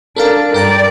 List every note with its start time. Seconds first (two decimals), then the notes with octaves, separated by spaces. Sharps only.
0.16 D4 A4 A#4 F5
0.54 G2 A#4 D5 G5 A#5